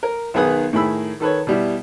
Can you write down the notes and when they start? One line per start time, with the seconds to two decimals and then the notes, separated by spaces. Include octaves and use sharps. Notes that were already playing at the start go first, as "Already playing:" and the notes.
0.03 A#4
0.34 B1 D#3 B3 G#4 B4 D#6
0.73 A2 D#3 G#4 B5 E6
1.20 D#3 A4 B4 C#5
1.47 B2 G3 E4